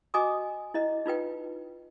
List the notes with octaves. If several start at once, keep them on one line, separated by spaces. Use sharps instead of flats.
F#4 D#5 G#5 D6 D#6
E4 D#5
D#4 F4 B4 G5